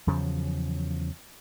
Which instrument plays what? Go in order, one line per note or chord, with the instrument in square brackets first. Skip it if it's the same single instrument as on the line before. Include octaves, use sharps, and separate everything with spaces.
[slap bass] E2 C#3 F3 F#3